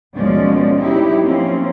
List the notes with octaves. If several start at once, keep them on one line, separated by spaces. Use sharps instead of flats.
D#2 B2 F3 G#3 C#4 D5
F#3 D#4 E4 G4
F3 A#3 C4 C#4